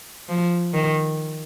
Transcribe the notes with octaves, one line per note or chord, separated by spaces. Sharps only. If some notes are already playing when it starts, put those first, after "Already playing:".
F3
D#3